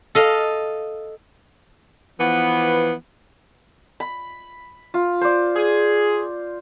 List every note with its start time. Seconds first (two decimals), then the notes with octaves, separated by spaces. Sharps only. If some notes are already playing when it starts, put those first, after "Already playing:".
0.15 A4 D#5 F5
2.20 E3 F3 B3
4.00 B5
4.94 F4
5.21 C5 D5
5.56 G#4